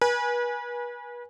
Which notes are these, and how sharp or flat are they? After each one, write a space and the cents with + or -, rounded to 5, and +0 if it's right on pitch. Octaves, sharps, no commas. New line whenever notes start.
B4 -35 G#5 +0